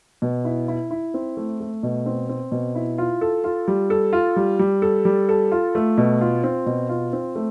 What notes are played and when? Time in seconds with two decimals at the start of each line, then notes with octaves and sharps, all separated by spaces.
0.22 B2
0.45 E4
0.68 E4
0.91 E4
1.14 C4
1.37 A3
1.60 A3
1.83 B2
2.06 C4
2.29 C4
2.52 B2
2.75 E4
2.98 F4
3.21 A4
3.44 F4
3.68 G3
3.90 A4
4.13 F4
4.36 G3
4.59 G3
4.82 A4
5.05 G3
5.29 A4
5.52 F4
5.75 A3
5.98 B2
6.21 F4
6.44 C4
6.66 B2
6.89 F4
7.13 C4
7.36 A3